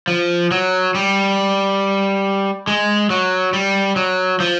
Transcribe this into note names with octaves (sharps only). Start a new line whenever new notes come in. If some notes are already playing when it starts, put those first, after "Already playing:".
F3
F#3
G3
G#3
F#3
G3
F#3
F3